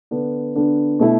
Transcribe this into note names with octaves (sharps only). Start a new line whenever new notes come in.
D3 B3 D4
D3 B3 D4
B2 A3 E4